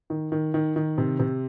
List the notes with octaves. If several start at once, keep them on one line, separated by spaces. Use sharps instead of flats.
D#3
D#3
D#3
D#3
C3
C3